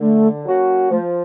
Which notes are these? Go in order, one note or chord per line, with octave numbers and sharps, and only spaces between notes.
D3 A3
F#3 A#3 C#4 F#4
F3 A3